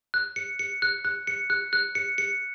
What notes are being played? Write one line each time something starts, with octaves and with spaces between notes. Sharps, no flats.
F#6
C#7
C#7
F#6
F#6
C#7
F#6
F#6
C#7
C#7